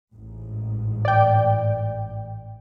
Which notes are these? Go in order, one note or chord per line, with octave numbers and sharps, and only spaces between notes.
A1 G#2
D5 G5